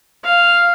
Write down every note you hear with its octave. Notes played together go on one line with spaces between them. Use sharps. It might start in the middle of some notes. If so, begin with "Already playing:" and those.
F5